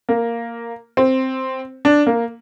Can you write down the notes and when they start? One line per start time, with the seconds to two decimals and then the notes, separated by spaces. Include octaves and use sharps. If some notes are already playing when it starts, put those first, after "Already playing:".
0.09 A#3
0.97 C4
1.85 D4
2.07 A#3